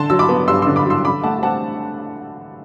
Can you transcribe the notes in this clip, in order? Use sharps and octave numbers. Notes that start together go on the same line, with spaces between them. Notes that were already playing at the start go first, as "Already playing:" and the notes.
Already playing: D3 A5 C6
F#3 E6
B5 D6
B3
G2 C6 E6
D3 C6 E6
B5 D6
F#3
C6 E6
D3 B5 D6
A3 F#5 A5
C4 F#5 A5